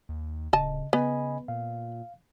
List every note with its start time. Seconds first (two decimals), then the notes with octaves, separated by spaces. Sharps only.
0.09 D#2
0.53 D1 C#3 D#5 A5
0.93 C#3 B3 D#5 G#5 B5
1.48 A#2 F5